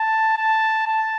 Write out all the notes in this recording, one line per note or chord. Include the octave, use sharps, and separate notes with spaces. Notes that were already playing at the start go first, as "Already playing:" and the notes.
Already playing: A5
A5
A5